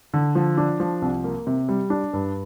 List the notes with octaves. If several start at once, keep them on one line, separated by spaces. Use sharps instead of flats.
D3
F3
D4
F3
C2
A#3
C3
G3
D4
G2